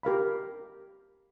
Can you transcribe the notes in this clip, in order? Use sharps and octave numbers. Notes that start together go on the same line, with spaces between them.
G4 A#4 F5 B5